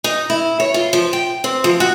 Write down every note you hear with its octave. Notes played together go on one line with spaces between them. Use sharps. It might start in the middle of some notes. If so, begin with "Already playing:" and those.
D#4
E4
C#5
F4
F3
G5
C4
F3
F#4